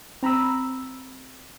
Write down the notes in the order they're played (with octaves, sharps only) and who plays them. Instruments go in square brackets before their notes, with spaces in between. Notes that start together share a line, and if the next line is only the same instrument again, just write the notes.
[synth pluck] C4 A#5 B5 E6